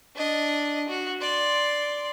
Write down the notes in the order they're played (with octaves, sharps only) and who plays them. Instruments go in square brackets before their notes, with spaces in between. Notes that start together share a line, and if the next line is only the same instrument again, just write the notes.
[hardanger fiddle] D4 D#5
F#4
D5 C6